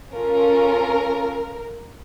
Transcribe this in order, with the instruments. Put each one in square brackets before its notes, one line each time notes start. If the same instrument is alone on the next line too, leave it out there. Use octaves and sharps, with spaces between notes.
[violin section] C#4 F4 A4 A#4